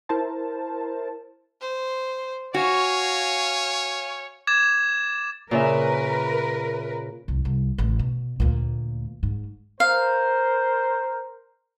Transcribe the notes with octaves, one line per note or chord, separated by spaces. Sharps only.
E4 A#4 C5 A5
C5
F#4 C#5 F5 G#5
D6 G#6 A6 E7
A#2 C#3 A#4 B4 E5
C2 F2
C2
A1
B2
D2 A#2
G#2
A#4 C5 F5